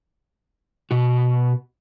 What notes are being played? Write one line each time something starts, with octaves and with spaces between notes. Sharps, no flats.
B2 F#4